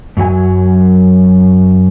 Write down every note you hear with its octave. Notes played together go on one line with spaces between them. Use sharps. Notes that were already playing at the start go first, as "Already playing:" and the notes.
F#2 F#3 F#4 G#5